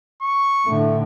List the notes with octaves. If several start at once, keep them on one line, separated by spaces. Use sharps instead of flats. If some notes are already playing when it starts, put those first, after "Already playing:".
C#6
A2 D3 A3